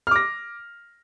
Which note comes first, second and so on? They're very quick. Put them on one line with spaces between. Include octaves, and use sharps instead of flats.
F6 D6 A#6